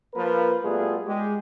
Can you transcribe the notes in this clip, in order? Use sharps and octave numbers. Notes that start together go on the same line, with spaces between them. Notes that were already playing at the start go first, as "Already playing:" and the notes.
F3 A#3 A#4 B4
B2 G3 A3 B3 F4 G#4
G#3 G4